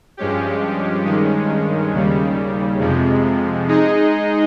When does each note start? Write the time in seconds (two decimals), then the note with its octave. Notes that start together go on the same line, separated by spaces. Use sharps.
0.17 G2 F3 G#3 C#4 G4
1.05 G2 D#3 G#3 C#4
1.93 D#2 C#3 G3
2.80 F2 C3 F3 G#3
3.68 G#3 D#4 G#4 D#5